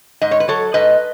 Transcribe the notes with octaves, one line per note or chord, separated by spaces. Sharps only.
G#2 D#5
C#5
B4
F#3 A4 C#5
G#2 B4 D#5